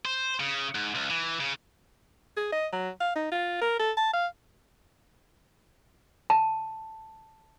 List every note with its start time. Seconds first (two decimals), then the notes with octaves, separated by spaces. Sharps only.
0.05 C5
0.40 C#3
0.75 G#2
0.95 C#2
1.10 E3
1.40 C#3
2.37 G#4
2.52 D#5
2.72 F#3
3.00 F5
3.15 D#4
3.31 F4
3.61 A#4
3.79 A4
3.97 A5
4.13 F5
6.30 A5